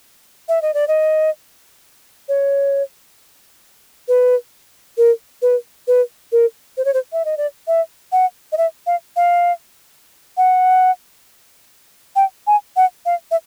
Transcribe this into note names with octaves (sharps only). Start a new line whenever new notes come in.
E5
D#5
D5
D#5
C#5
B4
A#4
B4
B4
A#4
C5
C#5
C5
E5
D#5
D5
E5
F#5
D#5
E5
F5
F5
F#5
G5
G#5
F#5
F5
E5